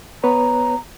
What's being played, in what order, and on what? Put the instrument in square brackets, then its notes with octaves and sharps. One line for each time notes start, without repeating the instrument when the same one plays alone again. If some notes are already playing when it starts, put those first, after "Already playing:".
[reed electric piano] B3 B4 C#5 [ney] A#5